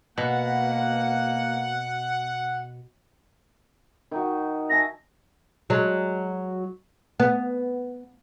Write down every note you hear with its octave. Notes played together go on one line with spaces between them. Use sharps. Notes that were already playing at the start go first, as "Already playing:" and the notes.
B2 A#3 F#5
D#3 D#4 F#4
E5 G#5 A5 A#6
F#3 G#3
B3